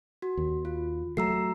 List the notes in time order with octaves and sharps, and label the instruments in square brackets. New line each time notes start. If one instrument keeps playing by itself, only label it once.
[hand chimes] F#4
[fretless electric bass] D#2
[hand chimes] F4
[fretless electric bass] F#3 A3 [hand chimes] A#5 E6 C7